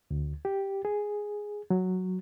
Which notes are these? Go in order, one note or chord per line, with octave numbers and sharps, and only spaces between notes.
D2
G4
G#4
F#3